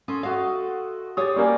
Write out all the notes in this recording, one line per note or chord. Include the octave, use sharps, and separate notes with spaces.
C#4 A4 C6 D#6
A3 F#4 A4 D#5 F5
G4 G#4 C#5 D5 D#6
G3 A#3 C#4 G#5